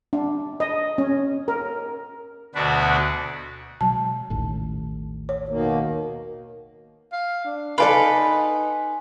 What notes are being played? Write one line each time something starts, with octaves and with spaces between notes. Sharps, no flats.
D4
D#5
C#4
A#4
D2 B2 D4 F#4 B4
B2 F#3 G#3 A5
A1 D#2 A2
C#5
B2 D#3 A#3
F5
D4
D#4 A4 B4 D5 F5 G#5 C6